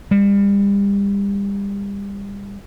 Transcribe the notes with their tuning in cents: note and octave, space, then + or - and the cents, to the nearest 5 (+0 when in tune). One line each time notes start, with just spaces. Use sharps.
G3 +35